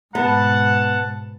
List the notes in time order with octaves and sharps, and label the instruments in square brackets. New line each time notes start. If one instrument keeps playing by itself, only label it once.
[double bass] G#2 B2 [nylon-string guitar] B3 [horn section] F#5 A5